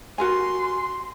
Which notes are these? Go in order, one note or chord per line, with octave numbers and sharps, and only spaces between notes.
F#4 A#4 G#5 C6